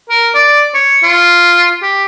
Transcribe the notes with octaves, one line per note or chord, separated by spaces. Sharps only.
A#4
D5
C#5
F4
G4